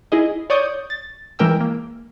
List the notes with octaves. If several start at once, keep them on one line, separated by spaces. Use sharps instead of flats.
E4 G#4 D#5
C#5 D5 C#6 D#6 G6
A6
E3 G#3 A#4 G5 E6
A#3